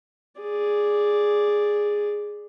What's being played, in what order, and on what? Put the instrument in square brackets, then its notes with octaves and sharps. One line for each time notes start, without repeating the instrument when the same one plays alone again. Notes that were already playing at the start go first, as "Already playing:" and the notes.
[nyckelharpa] G#4 D5